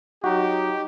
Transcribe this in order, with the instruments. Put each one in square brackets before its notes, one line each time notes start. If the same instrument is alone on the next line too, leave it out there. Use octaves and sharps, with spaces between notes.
[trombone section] F#3 D#4 [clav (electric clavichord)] F#4 [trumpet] G4